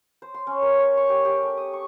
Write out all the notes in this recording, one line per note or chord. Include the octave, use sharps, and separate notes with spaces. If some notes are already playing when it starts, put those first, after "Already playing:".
C5
C6
C#4
A#4
C#5
C#6
G4
G4
A3
D#6
C#6